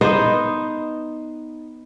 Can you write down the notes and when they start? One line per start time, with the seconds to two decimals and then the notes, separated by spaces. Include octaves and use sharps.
0.01 B3 D#4 C5 D#5